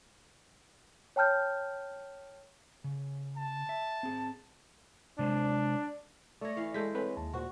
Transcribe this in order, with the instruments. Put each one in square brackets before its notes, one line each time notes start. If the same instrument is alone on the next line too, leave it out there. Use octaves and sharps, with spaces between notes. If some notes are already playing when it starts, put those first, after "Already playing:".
[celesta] C#5 G5 A5 F6 G6
[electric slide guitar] C#3
[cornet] A5
[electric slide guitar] E5
C4 G#4
[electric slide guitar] C3 G#3 C5 [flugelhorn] D4
[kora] A3 C#5 [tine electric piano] D5 A#6
[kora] E3 F5
[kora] G#3 [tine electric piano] A4 G6 B6
[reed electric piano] C4 B4 C#5
[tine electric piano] D#2 [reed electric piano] A5
[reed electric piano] A#2 C5 [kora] F#4